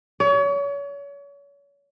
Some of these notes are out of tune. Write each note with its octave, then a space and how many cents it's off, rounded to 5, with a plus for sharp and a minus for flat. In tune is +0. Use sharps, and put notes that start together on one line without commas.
C#5 +35